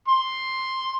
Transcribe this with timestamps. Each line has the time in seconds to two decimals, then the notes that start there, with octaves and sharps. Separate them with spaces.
0.08 C6